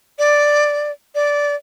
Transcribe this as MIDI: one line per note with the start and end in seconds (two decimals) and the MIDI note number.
0.19 0.91 74
1.15 1.56 74